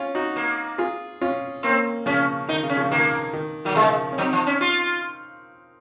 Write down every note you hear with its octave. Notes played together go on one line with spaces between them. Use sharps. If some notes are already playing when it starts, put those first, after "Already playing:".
Already playing: C#4 F4
D#4 F#4
A#3
F4 G#4
C#4 F4
A#3 C4 C#4
C#3 F3 C#4
D#3 D#4
C#3
C#4
C#3 F3
D#3 A#3
D#3
D#3 F#3
C#3 F3 G#3
C#4
F#3 C4 D#4
F3
C#4
F4